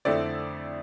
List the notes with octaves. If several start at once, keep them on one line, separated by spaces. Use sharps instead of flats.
F2 D3 A3 C4 E4 D5